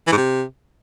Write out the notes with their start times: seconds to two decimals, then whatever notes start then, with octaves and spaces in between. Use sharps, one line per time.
0.07 E3
0.12 G#2
0.17 C3